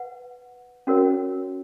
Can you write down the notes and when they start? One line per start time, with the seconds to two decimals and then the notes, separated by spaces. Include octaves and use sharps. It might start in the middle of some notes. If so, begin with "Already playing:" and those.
Already playing: B4 F#5
0.87 C#4 F#4 A#4 C#5